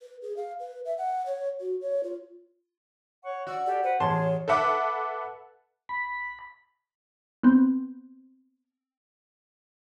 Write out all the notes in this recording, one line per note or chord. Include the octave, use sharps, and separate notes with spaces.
B4
G#4
F5
B4
E5
F#5
C#5
F#4
C#5
F4
C#5 F#5 C#6
F#4 D5 E6
G4 A4 D5
B4 C5 F#5
A1 G#4 C#5 A5 C6
A4 B4 E5 F#5 D6
B5
B3 C4